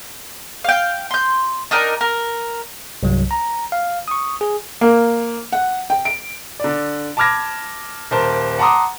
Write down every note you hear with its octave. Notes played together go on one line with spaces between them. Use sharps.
F5 G5
C6 G6
D4 D#4 A#4 G5
A#4
C2 G2 F#3
A#5
F5
C#6 D#6
G#4
A#3
F#5
G5
D7
D3 D5
A5 B5 D6 F6 G#6 A#6
D#1 A#4 C5 A5
F#5 A5 A#5 C6 D6 D#6